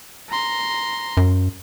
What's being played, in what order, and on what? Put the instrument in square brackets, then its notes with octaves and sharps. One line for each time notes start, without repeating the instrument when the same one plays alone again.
[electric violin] A#5 C6
[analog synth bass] F#2